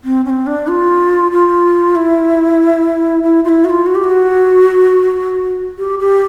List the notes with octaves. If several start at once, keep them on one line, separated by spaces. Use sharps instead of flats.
C4
C#4
C4
D4
F4
F4
E4
E4
F4
E4
F#4
F4
F#4
G4
F#4
G4
G4